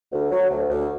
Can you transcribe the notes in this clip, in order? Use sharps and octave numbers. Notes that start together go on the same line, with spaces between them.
D2
F#3
D2
D2